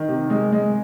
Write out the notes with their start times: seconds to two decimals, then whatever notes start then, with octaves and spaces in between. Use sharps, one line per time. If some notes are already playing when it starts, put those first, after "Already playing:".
Already playing: D#3
0.08 C3
0.30 G#3
0.52 G#3